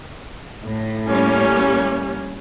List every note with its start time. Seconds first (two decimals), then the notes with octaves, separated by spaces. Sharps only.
0.63 A2
1.08 G3 A#3 C#4